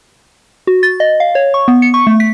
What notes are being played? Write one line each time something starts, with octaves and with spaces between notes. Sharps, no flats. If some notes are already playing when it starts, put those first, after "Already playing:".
F#4
A6
D#5
F5
C#5
C#6
B3
C#7
C#6
A3
B6